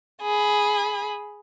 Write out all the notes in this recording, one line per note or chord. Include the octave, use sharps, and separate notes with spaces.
G#4 B5